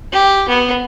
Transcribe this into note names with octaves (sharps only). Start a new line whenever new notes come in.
G4
B3